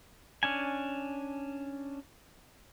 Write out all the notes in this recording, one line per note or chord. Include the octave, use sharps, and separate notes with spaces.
C#4 D4 G#5